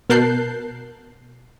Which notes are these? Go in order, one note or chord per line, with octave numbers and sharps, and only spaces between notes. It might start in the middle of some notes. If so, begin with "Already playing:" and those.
B2 A#4 A5 F#6 G6 C7